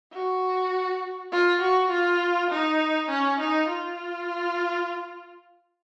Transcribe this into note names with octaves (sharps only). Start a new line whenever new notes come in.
F#4
F4
F#4
F4
D#4
C#4
D#4
F4